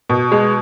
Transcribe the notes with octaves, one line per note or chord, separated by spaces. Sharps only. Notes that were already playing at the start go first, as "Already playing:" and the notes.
B2
G#3